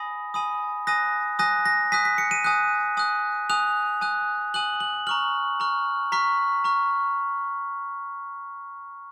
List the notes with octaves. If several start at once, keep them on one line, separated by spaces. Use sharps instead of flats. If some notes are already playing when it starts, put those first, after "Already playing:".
Already playing: G#5 B5 D#6 A#6
G#5 B5 D#6
G#5 D#6 F#6 A#6
G#5 D#6 F#6 A#6
A#6
G#5 D#6 F#6 B6
B6
C#7
D#7
G#5 D#6 F#6
G#5 D#6 F#6
G#5 D#6 F#6 F7
G#5 D#6 F#6
G#5 D#6 F#6 F#7
F#7
A#5 C#6 F6 F#7
A#5 C#6 F6
A#5 C#6 F6 B6
A#5 C#6 F6